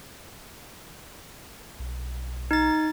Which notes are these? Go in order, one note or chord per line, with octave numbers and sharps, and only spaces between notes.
B1
D#4 A6